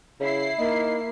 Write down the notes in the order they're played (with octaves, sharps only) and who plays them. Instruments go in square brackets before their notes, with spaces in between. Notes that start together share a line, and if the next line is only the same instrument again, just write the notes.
[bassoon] C#3 [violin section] E4 C7
[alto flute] A#3 [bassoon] D#4